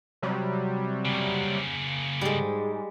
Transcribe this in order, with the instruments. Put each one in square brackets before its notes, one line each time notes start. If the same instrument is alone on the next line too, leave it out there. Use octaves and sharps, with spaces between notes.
[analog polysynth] C3 F#3 G3
[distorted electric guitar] C#3 A#3
[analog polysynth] G#2 [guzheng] G3 G#3